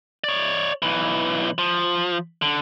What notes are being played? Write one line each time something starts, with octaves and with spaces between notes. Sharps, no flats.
C#5 D5
B1 E3
F3
D3